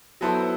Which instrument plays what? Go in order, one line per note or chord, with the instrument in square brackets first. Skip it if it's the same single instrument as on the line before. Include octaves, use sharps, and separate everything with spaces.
[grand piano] F#3 B3 E4 A4 C5